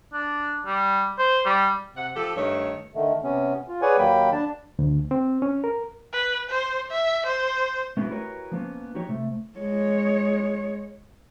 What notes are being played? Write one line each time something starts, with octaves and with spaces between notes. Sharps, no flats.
D4
G3
C5
G3
C3 F#5
F3 G4 A4
G2 D#3 A3 C#5
D3 D#3 A3
C3 B3 C#4
F4
G#4 B4 C#5 D5 F#5 G#5
D#2 F#3 A#3 G5 B5
D4 A5
D2
C4
C#4
A#4
B4
C5
E5
C5
A3 B3 C#4 D4 E4 F#4
E4 F#4 G4 A#4 B4 C#5
F3 A#3 B3 C#4
D#4 F#4 G4 C#5
C3 A3
G#3 C#5